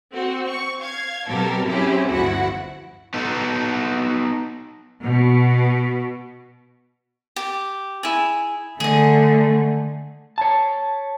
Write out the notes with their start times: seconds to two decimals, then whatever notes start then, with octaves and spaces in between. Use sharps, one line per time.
0.12 C4 F#4
0.48 C#6
0.82 F5 G#6
1.28 B2 F#3 C4 G4 A4 A#4
1.64 F#3 C4 C#4 E4 G4 G#4
2.10 G1 D2 F3 E4 F#4 F#5
3.14 B3 D#4 A4
5.03 B2
7.36 G4
8.03 E4 G#4
8.80 D3 A3 G#4 D#5
10.38 C#5 A5